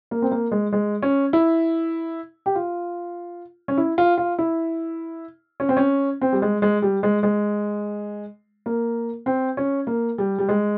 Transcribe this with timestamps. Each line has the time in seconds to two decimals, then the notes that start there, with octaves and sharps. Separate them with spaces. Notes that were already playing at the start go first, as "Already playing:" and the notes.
0.11 A#3
0.22 C4
0.31 A#3
0.52 G#3
0.73 G#3
1.03 C#4
1.33 E4
2.46 G4
2.55 F4
3.68 C#4
3.78 E4
3.98 F4
4.18 F4
4.38 E4
5.60 C#4
5.69 C4
5.77 C#4
6.21 C4
6.33 G3
6.42 G#3
6.62 G#3
6.82 G3
7.03 G#3
7.23 G#3
8.66 A#3
9.26 C4
9.57 C#4
9.87 A#3
10.18 G3
10.39 G3
10.49 G#3